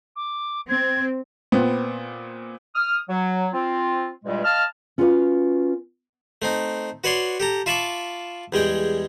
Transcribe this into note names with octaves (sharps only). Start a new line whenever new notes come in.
D6
C4 G#6
A#2 B3 C4
D#6 F6
F#3
C4 F4
E2 G2 A#2 G3 G#3
D#5 F5 A5 F6
C#4 F4 F#4 A#4 B4 F5
A3 C4 D#4
F#4 B4 C#5 D5 C6
G4 A4 A#5
F4 E5 A5 B5 C#6 D6
E2 G3 G#3 G5